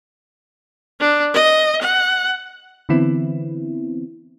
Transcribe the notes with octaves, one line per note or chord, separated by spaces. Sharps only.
D4
D#5
F#5
D3 E3 B3 C4 E4